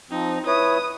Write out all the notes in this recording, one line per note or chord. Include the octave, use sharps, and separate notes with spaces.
F3 C4 D#4
E4 B4 C#5 D#6